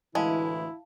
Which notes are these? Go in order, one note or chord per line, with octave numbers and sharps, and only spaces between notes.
D2 A2 E3 G#3 E4 F5 A5